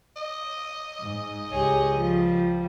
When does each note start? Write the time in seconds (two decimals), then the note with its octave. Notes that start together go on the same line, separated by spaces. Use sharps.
0.16 D#5
1.00 G#2
1.51 C#2 G4 G#4 C#5
1.95 F3 G3